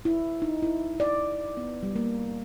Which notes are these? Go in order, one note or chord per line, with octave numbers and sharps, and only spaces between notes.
E4
D#4
E4
D5
B3
G3
A#3